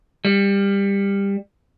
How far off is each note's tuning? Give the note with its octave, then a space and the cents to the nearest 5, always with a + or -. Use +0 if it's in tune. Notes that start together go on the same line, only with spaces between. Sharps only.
G3 +20